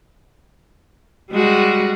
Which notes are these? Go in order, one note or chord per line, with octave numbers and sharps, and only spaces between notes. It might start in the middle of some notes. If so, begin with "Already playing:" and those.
G3 G#3 F#4